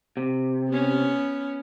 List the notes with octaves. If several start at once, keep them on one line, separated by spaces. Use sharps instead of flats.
C3
B3 C#4